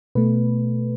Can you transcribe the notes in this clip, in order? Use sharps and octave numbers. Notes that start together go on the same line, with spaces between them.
B2 A3 B4